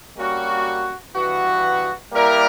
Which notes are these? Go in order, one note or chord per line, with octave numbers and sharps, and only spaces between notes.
G3 A#3 C#4 F#4
G2 E3 B3 F#4
G3 A#3 E4 A#4 D5